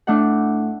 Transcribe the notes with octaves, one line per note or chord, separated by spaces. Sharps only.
A2 A3 D4 F#5